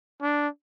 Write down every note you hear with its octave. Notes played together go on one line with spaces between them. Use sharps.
D4